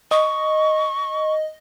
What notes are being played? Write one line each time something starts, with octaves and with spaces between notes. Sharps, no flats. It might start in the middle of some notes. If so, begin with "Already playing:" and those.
D#5 C#6